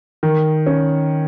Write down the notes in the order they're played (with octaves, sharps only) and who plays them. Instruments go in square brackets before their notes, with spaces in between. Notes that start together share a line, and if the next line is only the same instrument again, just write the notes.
[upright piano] D#3
C#4